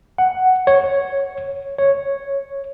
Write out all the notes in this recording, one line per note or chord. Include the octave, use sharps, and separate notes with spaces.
F#5
C#5
C#5